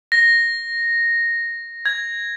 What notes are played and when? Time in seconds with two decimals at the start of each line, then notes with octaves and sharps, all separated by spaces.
0.12 A#6
1.86 G#6